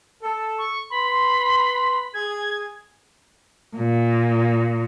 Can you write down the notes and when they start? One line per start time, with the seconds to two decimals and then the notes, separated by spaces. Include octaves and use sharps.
0.22 A4
0.58 C#6
0.90 B4 B5 C6
2.14 G#4 G#6
3.76 A#2